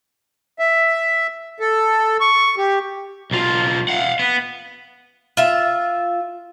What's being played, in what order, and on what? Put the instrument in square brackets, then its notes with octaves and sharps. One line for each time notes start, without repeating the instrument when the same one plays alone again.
[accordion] E5
A4
C#6
G4
[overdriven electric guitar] B1 F4
F5 F#5
B3
[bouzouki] F4 E5